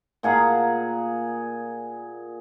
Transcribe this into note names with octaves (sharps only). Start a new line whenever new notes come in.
A#2 G#4 F#5 A#5